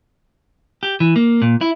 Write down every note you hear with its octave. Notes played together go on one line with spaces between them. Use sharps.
G4
E3
A#3
A#2
E4